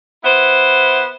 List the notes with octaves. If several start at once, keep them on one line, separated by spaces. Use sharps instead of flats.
B3 E4 C5